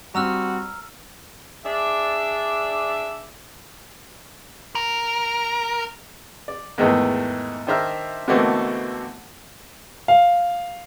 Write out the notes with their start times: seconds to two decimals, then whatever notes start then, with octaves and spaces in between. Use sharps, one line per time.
0.15 G3 C4 F#4 A#5 E6 F6
1.65 D4 G#4 D5 E5
4.75 A#4
6.48 D5
6.78 E2 G#2 D#3 E3 A3
7.67 D#3 D4 C5 E5 A#5 F6
8.28 B2 D3 E3 A3 A#3 C4
10.08 F5